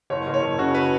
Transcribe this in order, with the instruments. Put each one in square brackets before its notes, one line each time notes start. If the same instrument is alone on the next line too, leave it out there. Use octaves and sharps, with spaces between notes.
[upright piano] F#1 [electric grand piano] C#5
[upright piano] F#1
[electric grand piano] C#5
[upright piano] F#1
[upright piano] C#3 [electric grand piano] F#4
[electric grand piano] B4